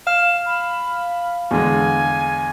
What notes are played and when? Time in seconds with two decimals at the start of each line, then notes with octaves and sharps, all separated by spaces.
0.07 F5 F6 E7
0.46 B5
1.51 E2 D3 G#3 G#5